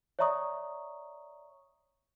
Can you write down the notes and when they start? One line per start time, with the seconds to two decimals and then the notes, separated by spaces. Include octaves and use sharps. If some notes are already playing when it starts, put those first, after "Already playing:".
0.19 C#5 D5 E5 A#5 C#6 D#6